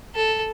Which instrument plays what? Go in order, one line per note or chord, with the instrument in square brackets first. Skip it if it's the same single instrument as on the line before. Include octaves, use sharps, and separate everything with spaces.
[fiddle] A4